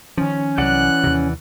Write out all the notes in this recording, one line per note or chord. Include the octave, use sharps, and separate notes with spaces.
D#3 F3 C#4
C2 E3 F#3 D5 F#5 F#6
D#2 C3